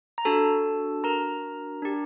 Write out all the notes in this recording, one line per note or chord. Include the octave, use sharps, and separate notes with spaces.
A#5
D4 F#4 A4 A5
A#4 A#5
D4 G4